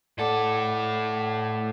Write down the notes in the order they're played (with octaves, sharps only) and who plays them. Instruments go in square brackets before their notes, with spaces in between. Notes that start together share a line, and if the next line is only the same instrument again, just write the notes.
[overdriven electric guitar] A2 A4 [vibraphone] D5 F#5 D6